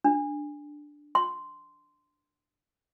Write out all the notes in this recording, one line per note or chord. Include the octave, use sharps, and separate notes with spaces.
D4
C6